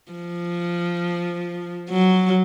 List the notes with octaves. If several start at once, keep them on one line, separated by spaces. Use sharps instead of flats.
F3
F#3